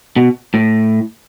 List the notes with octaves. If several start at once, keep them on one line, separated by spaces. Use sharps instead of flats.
B2
A2